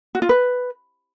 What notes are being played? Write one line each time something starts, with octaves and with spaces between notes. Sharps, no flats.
F#4
F4
B4